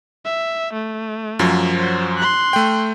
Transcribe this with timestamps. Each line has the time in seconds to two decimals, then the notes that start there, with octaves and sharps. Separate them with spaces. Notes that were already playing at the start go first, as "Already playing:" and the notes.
0.25 E5
0.74 A3
1.39 F#2 F3 F#3
1.77 F#4 C5
2.17 C6 F#6
2.53 A3 G5